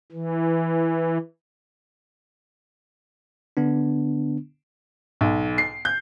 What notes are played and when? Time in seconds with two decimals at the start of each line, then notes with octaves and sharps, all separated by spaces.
0.12 E3
3.57 D3 B3 D4
5.21 B1
5.58 C7
5.85 G6